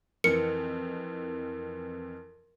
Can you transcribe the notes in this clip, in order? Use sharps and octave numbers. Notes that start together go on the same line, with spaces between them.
F2 E3 A#4 C#7